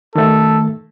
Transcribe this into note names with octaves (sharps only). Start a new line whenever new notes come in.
D#3 A3 A4